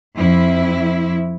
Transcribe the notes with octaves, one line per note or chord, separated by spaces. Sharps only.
F2 E4